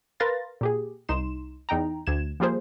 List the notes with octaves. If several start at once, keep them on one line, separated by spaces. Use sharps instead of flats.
A#4 B4 F5 C6 A6 A#6
A#2 G4 G#4
C2 D#4 C6 E7
E2 D#4 G5 A#5
D2 G#6 E7
F3 G3 A#3 F4 G#4 C5